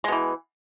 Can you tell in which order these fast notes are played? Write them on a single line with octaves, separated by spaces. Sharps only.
G#3 B2 E3